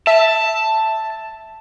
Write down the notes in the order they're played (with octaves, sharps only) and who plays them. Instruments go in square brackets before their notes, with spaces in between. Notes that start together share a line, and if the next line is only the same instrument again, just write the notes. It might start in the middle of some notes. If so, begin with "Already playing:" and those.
[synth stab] E5 [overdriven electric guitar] A5